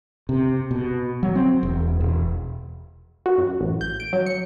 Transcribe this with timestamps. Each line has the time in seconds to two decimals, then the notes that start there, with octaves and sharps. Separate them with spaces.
0.29 C3
0.71 B2
1.23 F#3
1.35 C4
1.63 E1
2.01 E1
3.26 F#4
3.38 F#2
3.61 A1
3.81 G6
4.00 D7
4.13 F#3
4.26 C#7